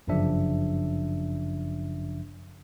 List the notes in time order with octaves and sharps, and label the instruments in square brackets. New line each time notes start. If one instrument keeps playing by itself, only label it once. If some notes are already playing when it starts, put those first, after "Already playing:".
[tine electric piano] G1 F#2 C#3 F3 D4 E5